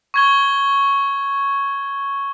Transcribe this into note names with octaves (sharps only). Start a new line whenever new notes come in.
C#6 G#6 G7